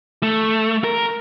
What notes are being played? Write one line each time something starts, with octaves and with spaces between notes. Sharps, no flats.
A3
A#4